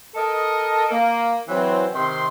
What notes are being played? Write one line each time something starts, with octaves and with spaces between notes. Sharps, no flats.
A4 A#4 D#5
A#3
E3 F#3 C4
C3 D#3 C6